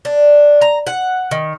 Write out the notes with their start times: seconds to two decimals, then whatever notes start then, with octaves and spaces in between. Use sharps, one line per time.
0.05 D4
0.62 A#5
0.87 F#5
1.31 D#3